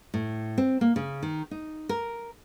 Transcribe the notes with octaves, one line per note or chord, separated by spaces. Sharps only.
A2
C4
A#3
C#3
D#3
D#4
A#4